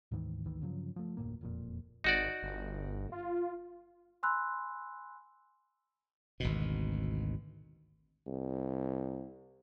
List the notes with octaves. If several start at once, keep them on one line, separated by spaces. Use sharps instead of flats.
D2 G#2 D#3 E3
G#1 D2 D#3 E3
G2 C#3 F3 F#3
F3 A3
F1 D2 A2 A#3
E1 F2 A#2
G#1 D#4 F#4 D5
G1
F4
G#5 B5 C6 E6 F#6
G#1 D2 B2
C2